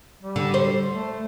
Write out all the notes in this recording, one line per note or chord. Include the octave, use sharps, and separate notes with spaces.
G3
D3
C5
A3